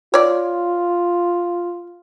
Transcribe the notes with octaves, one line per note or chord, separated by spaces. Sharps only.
F4 C#5 D5